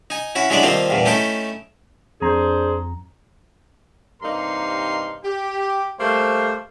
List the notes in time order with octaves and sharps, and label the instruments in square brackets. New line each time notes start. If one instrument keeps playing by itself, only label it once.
[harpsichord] D#4 G#5
C#4 E4 F#4
F#3 G#3 D4 E4 G#4 D5
D#3 F3 G3 A#3 C4 F4
E2 G2 A#2
A3 C#4 D#4 E4 G5 A5
[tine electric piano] F2 A#5 [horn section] D4 G#4 C5
[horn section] G2 C3 A#3 D#4 A#4 C6
G4
G3 A3 A#3 C5